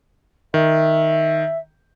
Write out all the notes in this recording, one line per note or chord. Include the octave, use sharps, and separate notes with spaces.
D#3 E5